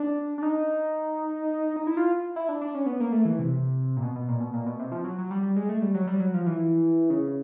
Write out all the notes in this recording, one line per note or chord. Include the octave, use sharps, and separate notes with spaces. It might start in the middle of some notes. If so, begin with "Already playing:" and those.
Already playing: D4
D4
D#4
D#4
E4
F4
E4
D4
D4
C#4
B3
A#3
A3
E3
C3
A#2
B2
B2
A#2
B2
A#2
B2
C3
F3
F#3
F#3
G3
G3
G#3
A3
G3
F#3
G3
F#3
F3
E3
C#3